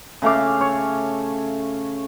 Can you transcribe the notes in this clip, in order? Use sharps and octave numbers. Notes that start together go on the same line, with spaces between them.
C#3 A3 F5 D6
C#5